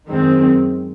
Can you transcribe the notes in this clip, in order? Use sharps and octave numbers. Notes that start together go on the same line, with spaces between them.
F#2 D#3 G#3 C4